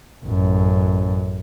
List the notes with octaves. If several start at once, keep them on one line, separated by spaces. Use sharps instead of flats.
A1 F#2